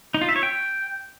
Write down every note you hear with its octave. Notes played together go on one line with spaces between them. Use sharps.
D#4
F4
E5
C#5
G5